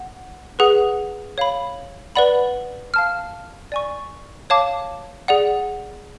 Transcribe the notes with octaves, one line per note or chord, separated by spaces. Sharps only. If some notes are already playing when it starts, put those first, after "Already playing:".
Already playing: F#5
G#4 B4 F#5
C#5 F5 B5
B4 D5 F#5 B5
F5 A5 F6
D5 G#5 C#6
C#5 F5 A5 D6
G#4 D5 F#5